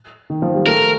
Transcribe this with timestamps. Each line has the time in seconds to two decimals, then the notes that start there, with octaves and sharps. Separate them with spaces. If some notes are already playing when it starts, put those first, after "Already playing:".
0.30 D#3
0.42 F3
0.55 G3
0.66 A3 A#4